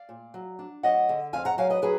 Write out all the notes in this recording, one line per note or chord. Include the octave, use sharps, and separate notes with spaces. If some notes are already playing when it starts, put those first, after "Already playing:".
Already playing: D5 F5
A#2
F#3
D4
F#3 D#5 F#5
D3
F2 F5 G#5
F#5 A#5
F#3 F5 G#5
B4 D#5
F#3 G#4 B4